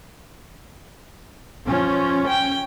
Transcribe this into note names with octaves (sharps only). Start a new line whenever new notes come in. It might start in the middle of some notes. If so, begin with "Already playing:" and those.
F3 C#4
G5